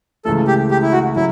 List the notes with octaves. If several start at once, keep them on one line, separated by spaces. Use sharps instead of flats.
C#2 C#3 E3 A3 A4
G4
G4
E4
F#4
C#3 F#3 E4